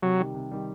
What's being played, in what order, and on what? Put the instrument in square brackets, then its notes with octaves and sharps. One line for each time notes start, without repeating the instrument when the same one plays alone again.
[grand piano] C3 [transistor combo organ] F#3
[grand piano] D#3 G3
C3
D#3 G3